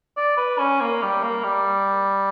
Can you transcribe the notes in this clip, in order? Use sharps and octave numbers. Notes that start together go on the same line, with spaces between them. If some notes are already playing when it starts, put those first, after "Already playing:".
D5
B4
C#4
A#3
G3
A#3
G3